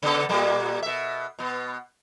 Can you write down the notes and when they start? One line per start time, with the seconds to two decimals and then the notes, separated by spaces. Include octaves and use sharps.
0.03 C#3 B3 A4
0.29 A#2 G3 A#3
0.83 B2 E5
1.39 B2 B3